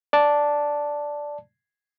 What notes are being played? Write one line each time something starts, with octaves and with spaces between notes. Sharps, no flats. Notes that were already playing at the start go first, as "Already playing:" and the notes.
D5 A5